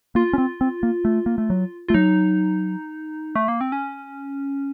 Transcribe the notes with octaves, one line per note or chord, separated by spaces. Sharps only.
A#3 F4
C#4
C4
C4
A#3
A3
A#3
A3
F#3
A3 F4
F#3 D#4
A3
A#3
C4
C#4